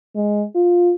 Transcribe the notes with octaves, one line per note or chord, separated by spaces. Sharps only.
G#3
F4